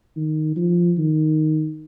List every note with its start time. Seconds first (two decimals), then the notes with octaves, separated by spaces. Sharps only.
0.16 D#3
0.56 F3
0.98 D#3